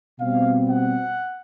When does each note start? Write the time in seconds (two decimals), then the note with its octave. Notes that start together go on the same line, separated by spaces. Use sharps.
0.19 B2 G3 C4 F5
0.69 F#5